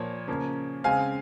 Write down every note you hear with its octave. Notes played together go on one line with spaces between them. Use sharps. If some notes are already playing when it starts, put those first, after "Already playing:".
Already playing: A#2 F3 A#3 C#5
C#3 F3 A#3
C#3 G#3 C4 F5 G#5